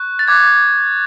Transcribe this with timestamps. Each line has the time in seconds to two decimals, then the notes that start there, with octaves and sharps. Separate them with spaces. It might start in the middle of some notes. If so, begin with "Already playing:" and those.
Already playing: C#6 F#6
0.19 A6
0.28 D6 F#6 G#6